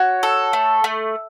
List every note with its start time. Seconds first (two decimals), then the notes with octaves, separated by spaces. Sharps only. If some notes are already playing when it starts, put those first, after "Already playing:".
Already playing: F#4 C#5
0.23 A4
0.53 A3
0.84 A3